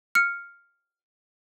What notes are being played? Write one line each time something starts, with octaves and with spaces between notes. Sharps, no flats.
F6 C#7